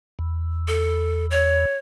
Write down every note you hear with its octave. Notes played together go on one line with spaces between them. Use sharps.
E2
A4
C#5